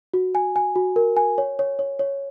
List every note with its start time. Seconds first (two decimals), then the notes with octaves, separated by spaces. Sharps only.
0.13 F#4
0.35 G#5
0.56 G#5
0.75 F#4
0.96 A#4
1.17 G#5
1.38 C#5
1.59 C#5
1.79 C#5
1.99 C#5